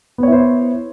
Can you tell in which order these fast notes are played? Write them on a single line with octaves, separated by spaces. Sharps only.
B3 C#5 E4 C5